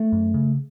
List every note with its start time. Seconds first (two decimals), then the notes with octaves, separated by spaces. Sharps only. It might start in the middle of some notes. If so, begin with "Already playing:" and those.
Already playing: A3
0.12 F#2
0.34 C#3